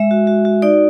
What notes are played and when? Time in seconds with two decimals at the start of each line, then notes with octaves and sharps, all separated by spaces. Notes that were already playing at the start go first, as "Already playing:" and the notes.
Already playing: G#3 E5
0.11 F#4
0.27 F#4
0.45 F#4
0.62 D#4 D5